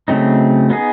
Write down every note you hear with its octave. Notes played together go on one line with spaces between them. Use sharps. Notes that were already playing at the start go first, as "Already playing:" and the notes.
C#3 F#3 A3 C4 D#4
B3 D#4 G#4